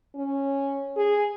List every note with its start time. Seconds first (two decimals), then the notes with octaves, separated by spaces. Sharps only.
0.16 C#4
0.96 G#4